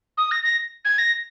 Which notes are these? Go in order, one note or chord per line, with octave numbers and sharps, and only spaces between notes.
D#6
A#6
A#6
G#6
A#6